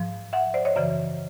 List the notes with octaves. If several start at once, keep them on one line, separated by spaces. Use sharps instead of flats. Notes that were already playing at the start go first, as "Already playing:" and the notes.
Already playing: G#2 F3
E5 F#5
C5 D5
C#5 D#5
F#2 C#3 E3 D5 E5